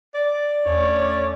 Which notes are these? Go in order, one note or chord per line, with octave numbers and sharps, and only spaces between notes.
D5
E2 A3 C#4 C#5